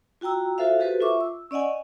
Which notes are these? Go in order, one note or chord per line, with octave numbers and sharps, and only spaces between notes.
F4 F#4 G5 A#5 E6
F4 F#4 A4 C5 E5 F5
F#4 G4 A4 B4 C5
F4 E5 C#6 D6
E6
C#4 D5 D#5 F#5 G#5